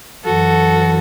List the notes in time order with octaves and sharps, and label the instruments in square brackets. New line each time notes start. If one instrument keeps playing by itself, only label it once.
[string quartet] F#2 E3 F#4 A4